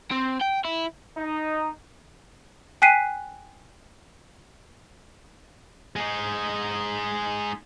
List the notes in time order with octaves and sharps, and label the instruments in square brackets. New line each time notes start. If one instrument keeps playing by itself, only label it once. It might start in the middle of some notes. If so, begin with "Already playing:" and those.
[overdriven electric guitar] C4
G5
E4
[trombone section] D#4
[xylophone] G5 G#5 F#6 B6 C7 D#7
[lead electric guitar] G#3 D#4